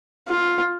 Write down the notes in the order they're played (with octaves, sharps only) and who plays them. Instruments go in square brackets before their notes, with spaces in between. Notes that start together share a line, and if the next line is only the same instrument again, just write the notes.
[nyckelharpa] F4